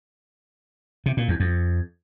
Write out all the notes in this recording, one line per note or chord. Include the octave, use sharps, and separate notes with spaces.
C3
A#2
E2
F2